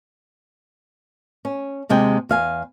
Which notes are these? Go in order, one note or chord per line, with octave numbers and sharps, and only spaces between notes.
C#4
D#2 C3 G#3 G5
E2 F5 G#5